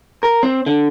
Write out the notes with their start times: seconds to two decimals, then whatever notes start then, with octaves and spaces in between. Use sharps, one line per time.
0.23 A#4
0.43 C4
0.66 D3